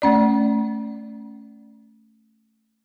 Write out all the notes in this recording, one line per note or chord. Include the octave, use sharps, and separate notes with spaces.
A3 C#4 D5